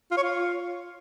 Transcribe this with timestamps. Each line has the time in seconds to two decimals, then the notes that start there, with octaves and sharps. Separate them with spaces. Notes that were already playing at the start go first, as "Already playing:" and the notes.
0.11 F4
0.17 C#5
0.23 F4